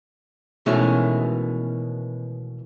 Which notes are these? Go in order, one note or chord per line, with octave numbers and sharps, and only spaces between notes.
B2 D#3 E3 G#3 A3 C#4